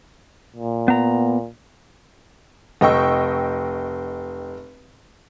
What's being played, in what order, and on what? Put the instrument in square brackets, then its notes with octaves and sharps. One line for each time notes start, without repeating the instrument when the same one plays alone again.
[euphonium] A#2
[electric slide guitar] B3 A#5
[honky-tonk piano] F1 D#5 G5 C#6 E6